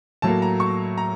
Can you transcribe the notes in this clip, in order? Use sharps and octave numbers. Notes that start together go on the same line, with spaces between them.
A2 F#3 A#3 A5
A#5
C#6
A#5